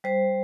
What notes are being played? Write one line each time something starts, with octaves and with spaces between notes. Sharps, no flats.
G3 C5